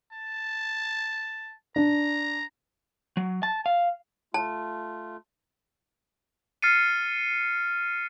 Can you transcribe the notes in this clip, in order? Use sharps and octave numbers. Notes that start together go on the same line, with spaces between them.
A5
D4 A#5
F#3
A5
F5
A3 F4 A5
F6 A6 C7 C#7 D#7